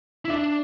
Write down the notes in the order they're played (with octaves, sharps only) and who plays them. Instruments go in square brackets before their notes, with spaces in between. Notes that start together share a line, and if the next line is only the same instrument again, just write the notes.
[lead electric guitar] E4
[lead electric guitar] D4 [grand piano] E5